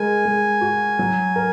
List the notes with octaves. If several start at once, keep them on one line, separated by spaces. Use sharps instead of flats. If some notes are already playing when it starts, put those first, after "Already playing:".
Already playing: G#3 A#4 G#5
G#3
F#4
F#3
A#4